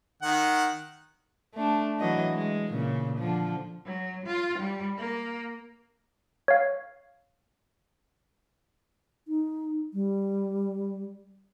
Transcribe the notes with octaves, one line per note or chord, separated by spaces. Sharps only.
D#3 F#5
A3 D4
E3 F#3 D#5
G#3
A#2 C#3
D3 F3
F#3
F4
G3
A#3
C#5 F5
D#4
G3